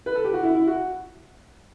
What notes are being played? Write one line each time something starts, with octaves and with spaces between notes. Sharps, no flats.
B4
A4
G4
F#4
E4
E4
F#4